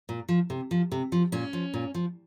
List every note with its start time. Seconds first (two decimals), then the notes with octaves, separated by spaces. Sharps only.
0.09 A#2
0.28 F3
0.50 C3
0.71 F3
0.92 C3
1.12 F3
1.32 A#2 C#4
1.53 F3
1.74 A#2
1.94 F3